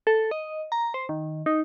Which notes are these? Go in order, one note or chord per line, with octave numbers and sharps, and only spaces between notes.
A4
D#5
A#5
C5
D#3
D#4